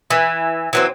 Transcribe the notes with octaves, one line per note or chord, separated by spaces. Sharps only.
E3
E3 F#3 C4